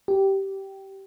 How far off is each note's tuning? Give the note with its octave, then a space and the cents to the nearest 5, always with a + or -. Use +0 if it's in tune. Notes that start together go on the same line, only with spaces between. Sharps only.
G4 -15